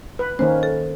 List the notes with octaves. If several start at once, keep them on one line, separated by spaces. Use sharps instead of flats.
B4
D#3 A#3 C#4 C5
A4